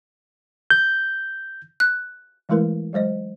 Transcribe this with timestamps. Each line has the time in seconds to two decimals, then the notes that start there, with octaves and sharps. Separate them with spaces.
0.70 G6
1.80 F#6
2.49 E3 G#3 A3 E4 A#4 B4
2.93 F#3 G#3 C5 D#5